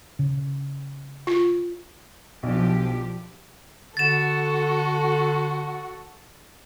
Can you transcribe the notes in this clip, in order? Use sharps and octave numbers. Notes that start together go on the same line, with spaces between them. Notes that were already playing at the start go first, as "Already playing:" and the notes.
C#3
F4
B1 F3 D4 G4
D3 F#4 A4 A6 E7